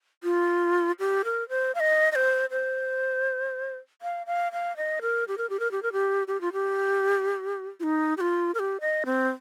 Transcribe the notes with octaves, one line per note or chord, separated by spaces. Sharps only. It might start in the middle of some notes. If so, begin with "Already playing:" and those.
F4
G4
A#4
C5
F5
D#5
D#5
C5
C5
F5
F5
F5
D#5
A#4
G4
A#4
G4
A#4
G4
A#4
G4
G4
F4
G4
F4
D#4
G4
F4
A#4
G4
D#5
C4